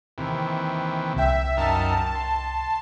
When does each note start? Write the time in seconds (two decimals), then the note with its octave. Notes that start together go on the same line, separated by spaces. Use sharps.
0.18 D#2 C3 E3
1.16 C2 E5 G5
1.57 F#2 D#4 A#4 A5
2.15 C6